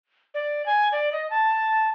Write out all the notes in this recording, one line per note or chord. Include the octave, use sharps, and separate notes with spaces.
D5
G#5
D5
D#5
A5